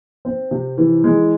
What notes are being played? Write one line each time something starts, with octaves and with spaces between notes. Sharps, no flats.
C4
C3
E3
G#3